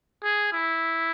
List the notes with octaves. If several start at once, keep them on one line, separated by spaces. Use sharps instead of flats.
G#4
E4